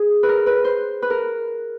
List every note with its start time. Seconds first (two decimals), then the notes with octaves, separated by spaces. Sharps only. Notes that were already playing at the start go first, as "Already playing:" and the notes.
Already playing: G#4
0.23 B4
0.29 A#4
0.46 B4
0.64 C5
1.02 B4
1.10 A#4